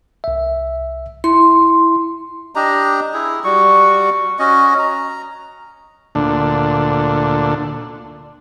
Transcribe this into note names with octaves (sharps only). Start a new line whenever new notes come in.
C2 E5
E4 C6
D4 G4 D#5 A#5
E4 G#4
G3 F#4 C#6
C#4 F#4 D#5
A#5
D2 A#2 D3 D4